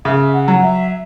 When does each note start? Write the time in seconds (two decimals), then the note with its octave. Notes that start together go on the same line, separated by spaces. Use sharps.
0.05 C#3 E5
0.33 F#5
0.48 F#3
0.62 E5